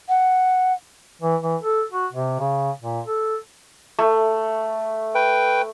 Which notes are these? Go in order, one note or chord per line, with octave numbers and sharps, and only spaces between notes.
F#5
E3
E3
A4
F#4
C3
C#3
A#2
A4
A3
B4 G5